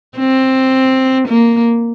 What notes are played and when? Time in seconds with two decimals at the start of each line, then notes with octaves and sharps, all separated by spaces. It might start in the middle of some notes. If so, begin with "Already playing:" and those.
0.18 C4
1.28 A#3